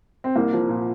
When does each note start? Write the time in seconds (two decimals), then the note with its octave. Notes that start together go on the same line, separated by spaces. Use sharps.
0.24 C4
0.36 C2 A#3
0.53 F3
0.69 A#2